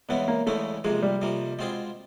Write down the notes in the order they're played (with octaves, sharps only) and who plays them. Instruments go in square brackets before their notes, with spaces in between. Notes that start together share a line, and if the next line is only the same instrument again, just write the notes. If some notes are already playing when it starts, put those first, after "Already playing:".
[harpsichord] E2 C#3 E3 G#3 C#4 [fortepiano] B3
[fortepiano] A#3
[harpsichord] E2 C#3 E3 G#3 C#4 [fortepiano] A3
[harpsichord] F2 C3 F3 A#3 [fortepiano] G#3
[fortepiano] G3
[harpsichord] F2 C3 F3 A#3
B2 G#3 C4 F4 G#4